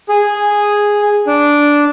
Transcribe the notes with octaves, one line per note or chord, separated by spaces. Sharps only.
G#4
D4